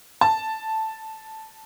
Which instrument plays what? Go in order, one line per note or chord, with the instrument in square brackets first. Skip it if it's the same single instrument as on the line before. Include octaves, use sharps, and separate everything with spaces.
[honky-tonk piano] A5